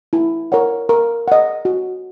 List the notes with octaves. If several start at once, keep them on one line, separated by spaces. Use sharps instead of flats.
E4
A#4 C#5 F#5
A#4
D#5 F#5
F#4